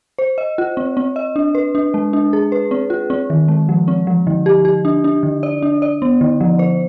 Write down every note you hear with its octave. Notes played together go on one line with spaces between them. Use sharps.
C5
D#5
F4
C4
C4
D#5
D4
B4
D4
G#3
D4
G#4
B4
C4
F4
C4
D#3
G#3
F3
C4
F3
D3
G4
G4
D4
D4
D3
D5
D4
D5
B3
D3
F3
C5